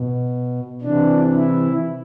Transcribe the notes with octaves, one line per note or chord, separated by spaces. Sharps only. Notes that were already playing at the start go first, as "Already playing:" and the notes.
Already playing: B2
C3 E3 D4
E4